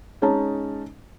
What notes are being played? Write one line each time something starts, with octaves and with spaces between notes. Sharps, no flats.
G#3 C#4 D#4 A5